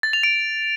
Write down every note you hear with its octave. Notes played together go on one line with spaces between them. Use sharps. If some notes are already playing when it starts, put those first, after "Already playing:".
A6
F7
D7